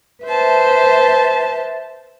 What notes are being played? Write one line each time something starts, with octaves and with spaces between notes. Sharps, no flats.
B4 C5 E5 A5